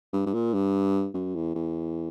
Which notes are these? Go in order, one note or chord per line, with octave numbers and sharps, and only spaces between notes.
G2
G2
A#2
G2
F#2
E2
E2